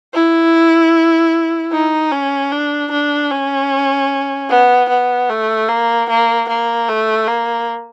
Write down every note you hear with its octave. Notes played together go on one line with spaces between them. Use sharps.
E4
D#4
C#4
D4
D4
C#4
B3
B3
A3
A#3
A#3
A#3
A3
A#3